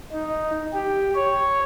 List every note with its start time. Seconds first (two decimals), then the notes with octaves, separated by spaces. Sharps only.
0.12 D#4
0.74 G4
1.15 C#5